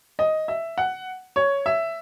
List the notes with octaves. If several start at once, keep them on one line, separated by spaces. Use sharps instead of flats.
D#5
E5
F#5
C#5
E5